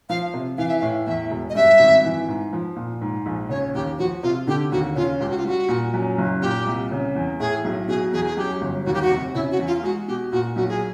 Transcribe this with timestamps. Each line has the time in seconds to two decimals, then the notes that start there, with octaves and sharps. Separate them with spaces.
0.09 F3 F5
0.33 C3
0.58 E3 F5
0.68 E5
0.79 F5
0.82 A2
1.07 E2 E5
1.30 E1
1.50 D#5
1.55 G2 E5
1.79 G#1
2.04 E3
2.28 G#2
2.53 F3
2.76 A#2
3.01 G#2
3.26 A#1
3.49 C#3 C#5
3.75 D#2 G4
3.99 F3 F#4
4.23 C3 F4
4.47 D3 G4
4.71 D#2 F#4
4.96 C#3 F4
5.20 C#2 G4
5.30 F#4
5.38 F4
5.45 G3 F#4
5.69 A#2
5.94 F#2
6.18 F#1
6.42 A#2 G4
6.67 C2
6.91 C#3
7.15 E2
7.40 A2 G#4
7.65 B1
7.88 B2 G#4
8.13 E2 G#4
8.26 G#4
8.37 F#2 G4
8.61 G1
8.86 D#2 F#4
8.94 G4
9.02 F#4
9.11 F1
9.34 C#3 E4
9.51 F#4
9.59 E2
9.67 F4
9.83 G#3 F#4
10.08 B2 G4
10.32 A#2 F#4
10.56 B1 F#4
10.69 G#4